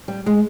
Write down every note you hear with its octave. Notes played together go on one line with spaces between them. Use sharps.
G3
G#3